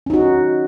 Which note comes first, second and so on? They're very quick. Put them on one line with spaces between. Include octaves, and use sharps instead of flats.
C#4 D#4 F#4